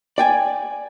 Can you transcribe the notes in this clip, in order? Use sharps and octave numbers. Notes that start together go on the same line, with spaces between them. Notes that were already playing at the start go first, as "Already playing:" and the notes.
D5 G5 G#5